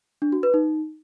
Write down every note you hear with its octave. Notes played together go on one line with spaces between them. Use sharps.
D4
F#4
B4
D#4